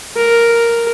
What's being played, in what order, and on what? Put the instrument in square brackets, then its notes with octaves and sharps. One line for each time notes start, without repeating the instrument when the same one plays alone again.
[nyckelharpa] A#4